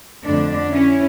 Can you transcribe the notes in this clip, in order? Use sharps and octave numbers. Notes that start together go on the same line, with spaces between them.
F2 D3 A3 D4
C#4 E4